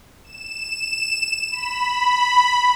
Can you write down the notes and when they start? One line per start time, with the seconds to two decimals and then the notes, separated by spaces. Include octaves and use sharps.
0.24 E7
1.51 B5